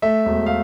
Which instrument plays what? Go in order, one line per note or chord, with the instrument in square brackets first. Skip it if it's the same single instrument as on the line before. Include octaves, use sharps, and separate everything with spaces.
[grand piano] A3 E5
E1
F5